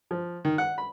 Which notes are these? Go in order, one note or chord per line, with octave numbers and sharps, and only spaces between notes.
F3
D#3
F#5
B5